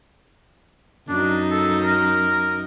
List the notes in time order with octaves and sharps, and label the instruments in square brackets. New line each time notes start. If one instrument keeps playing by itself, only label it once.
[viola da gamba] F#2 D#4 [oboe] D4
[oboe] A4
A#4